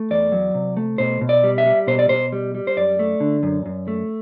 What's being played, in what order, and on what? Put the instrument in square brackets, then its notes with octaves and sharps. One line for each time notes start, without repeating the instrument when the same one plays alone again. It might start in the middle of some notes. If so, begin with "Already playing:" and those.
Already playing: [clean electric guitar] A3
E2 D5
F#3
C3
A3
B2 C5
B2
D5
G3
E5
G3
B2 C5
D5
B2 C5
G3
G3
C5
F#2 D5
A3
D3
F#2
F#2
A3